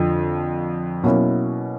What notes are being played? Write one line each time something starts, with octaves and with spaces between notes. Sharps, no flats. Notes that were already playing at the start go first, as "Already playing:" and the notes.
Already playing: F2 D3 F3
B2 F#3 A#3 C#4 E4